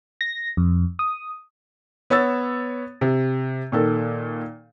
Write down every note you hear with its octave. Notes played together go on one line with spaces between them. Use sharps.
A#6
F2
D#6
B3 C#5 E6 A6
C3
A#2 D#3 A4